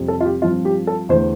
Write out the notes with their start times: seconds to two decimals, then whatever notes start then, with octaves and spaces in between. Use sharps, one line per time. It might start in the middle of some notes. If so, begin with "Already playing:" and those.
Already playing: F2 C3 G3 C4
0.08 A4
0.21 F4
0.25 G4
0.42 G2 F3 C4 F4
0.65 G4
0.87 A4
1.09 E2 D3 A3 C5